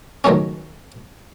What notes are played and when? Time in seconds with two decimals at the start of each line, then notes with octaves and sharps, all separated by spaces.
0.24 C#2 D#3 F#3 A3 C#4